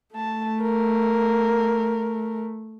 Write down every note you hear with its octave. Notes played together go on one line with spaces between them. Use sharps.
A3 A5
A#4